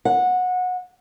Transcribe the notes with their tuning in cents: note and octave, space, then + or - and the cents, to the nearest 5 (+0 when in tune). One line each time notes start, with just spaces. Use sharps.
F#5 -20